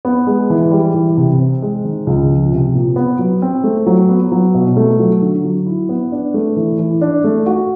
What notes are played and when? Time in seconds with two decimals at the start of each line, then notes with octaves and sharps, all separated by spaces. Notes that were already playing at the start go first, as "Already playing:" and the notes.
0.05 B3
0.27 G#3
0.50 E3
0.71 G3
0.94 E3
1.17 C3
1.39 C4
1.62 G#3
1.85 D#3
2.07 C#2
2.30 F3
2.52 C3
2.74 A#2
2.96 B3
3.19 F#3
3.42 C4
3.64 A3
3.86 F#3
4.09 B3
4.32 F#3
4.54 B2
4.77 A3
4.99 F#3
5.22 D3
5.44 F#3
5.66 E4
5.89 B3
6.12 D4
6.34 A3
6.57 E3
6.79 E3
7.01 D4
7.24 A3
7.46 F#4